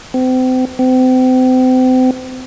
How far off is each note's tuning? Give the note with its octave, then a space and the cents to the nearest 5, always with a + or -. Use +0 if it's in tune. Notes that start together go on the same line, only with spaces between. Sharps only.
C4 -35
C4 -35